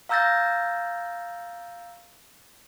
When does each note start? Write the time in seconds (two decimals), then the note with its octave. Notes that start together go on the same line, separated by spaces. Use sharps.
0.09 F5 A#5 E6 G6 A6 A#6